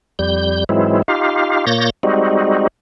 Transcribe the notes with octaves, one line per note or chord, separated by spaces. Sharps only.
F2 G3 G6
G#2 E3 F#3 G#3 C4 E4
D#4 F4 G4 F5
A#2 A#3 C#5 G6 A6 A#6
G3 G#3 C4 D#4 F#4